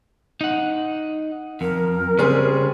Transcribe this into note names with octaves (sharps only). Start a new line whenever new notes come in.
D#4 F#5
F2 A#4
C#3 G3 C4 G#4